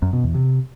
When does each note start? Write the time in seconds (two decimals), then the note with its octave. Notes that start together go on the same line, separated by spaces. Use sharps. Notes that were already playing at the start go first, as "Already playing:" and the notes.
0.02 F#2
0.13 B2
0.24 E2
0.35 C3